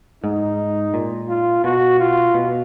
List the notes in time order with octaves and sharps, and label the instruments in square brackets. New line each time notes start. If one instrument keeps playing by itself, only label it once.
[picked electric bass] G#2 [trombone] D#4
[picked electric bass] A#2
[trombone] F4
[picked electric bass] B2 [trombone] F#4
[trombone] F4
[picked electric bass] B2